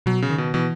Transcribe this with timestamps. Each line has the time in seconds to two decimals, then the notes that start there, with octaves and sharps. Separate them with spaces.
0.06 B2 F#3
0.22 C#3
0.30 D#3
0.38 B2
0.54 B2 E3